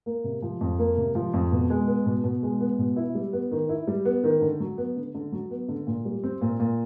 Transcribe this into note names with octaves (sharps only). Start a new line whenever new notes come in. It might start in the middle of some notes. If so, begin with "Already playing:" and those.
A#3
C3
F3
F2
A#3
C3
F3
F2
B2
G#3
B3
B2
B2
G#3
B3
B2
E4
G3
B3
D#3
E4
G3
B3
D#3
D3
F#3
B3
D3
D3
F#3
B3
D3
A#2
G3
C4
A#2
A#2